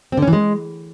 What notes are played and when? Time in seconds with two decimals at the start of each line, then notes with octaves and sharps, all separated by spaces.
0.12 C4
0.17 D3
0.23 C#4
0.28 E3
0.33 G#3